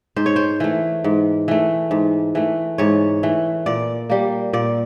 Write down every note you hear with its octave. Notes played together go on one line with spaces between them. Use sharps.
G#2 C5
C#5
C5
E3 A3
G#2
E3 A3
G#2
E3 A3
G#2 C#5
E3 A3
A#2 D5
G3 A#3
A#2 D5